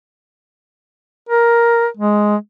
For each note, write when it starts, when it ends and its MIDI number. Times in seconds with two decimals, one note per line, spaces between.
1.29 1.86 70
1.97 2.36 56